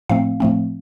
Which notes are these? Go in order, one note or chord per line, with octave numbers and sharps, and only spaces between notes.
A2 F3 A3 C4 F5
A2 F3 A3 C4